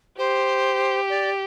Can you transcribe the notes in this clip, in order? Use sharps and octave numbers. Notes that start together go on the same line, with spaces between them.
G4 C5
D5